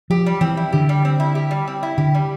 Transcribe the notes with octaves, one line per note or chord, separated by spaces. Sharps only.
F3 G4
G3
E3 C4
E4
D3 G4
G3
C4
E4
G4
G3
C4
E4
D3 G4
G3